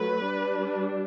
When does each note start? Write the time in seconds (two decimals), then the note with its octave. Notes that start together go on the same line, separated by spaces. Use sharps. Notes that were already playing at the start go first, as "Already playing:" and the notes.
Already playing: F#3 A3 B4
0.27 G3 D4